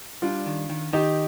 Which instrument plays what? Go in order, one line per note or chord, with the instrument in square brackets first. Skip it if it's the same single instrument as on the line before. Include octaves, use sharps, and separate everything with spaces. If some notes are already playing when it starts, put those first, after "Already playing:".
[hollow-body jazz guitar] G3 [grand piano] D4 F4
[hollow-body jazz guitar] D#3
D#3
[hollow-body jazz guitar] D#3 [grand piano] D#4 G4